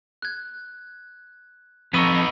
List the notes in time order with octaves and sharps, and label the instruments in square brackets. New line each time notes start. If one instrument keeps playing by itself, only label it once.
[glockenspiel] F#6 G#6
[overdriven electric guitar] F2 [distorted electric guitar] B3 D#4 [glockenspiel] C#6 E6 D#7